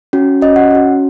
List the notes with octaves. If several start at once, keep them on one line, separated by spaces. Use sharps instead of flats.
C#4 F#4
C#4 F#4 D#5
F#5
C#4 F#4